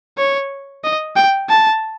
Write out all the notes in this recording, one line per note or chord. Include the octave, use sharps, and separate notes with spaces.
C#5
D#5
G5
A5